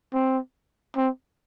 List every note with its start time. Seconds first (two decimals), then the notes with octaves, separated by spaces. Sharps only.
0.14 C4
0.96 C4